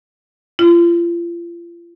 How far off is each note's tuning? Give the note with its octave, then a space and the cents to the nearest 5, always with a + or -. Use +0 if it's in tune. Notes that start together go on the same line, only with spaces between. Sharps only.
F4 -35